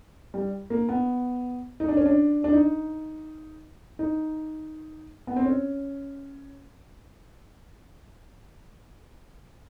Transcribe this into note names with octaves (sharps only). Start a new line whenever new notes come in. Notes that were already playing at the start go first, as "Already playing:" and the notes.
G3
A#3
B3
D#4
D4
C#4
D4
D4
D#4
D#4
B3
C4
C#4